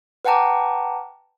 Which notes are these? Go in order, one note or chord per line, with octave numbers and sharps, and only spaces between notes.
B4 F#5 G5 A5 A#5 D6